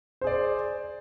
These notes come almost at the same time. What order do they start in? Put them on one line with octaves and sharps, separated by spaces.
C5 G#4 D5